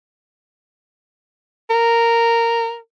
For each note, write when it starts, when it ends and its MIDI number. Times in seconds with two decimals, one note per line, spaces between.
1.70 2.77 70